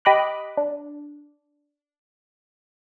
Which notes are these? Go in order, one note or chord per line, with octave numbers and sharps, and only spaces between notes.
G4 D#5 B5 D6 F#6
D4